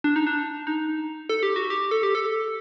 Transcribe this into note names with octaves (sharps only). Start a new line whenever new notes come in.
D4
D#4
D4
D#4
A4
G4
F#4
G4
A4
G4
A4